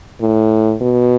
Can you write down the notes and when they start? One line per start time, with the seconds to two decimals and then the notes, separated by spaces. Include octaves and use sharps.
0.21 A2
0.81 B2